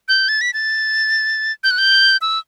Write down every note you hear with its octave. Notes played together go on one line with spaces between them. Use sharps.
G6
A6
B6
A6
G6
F#6
G6
E6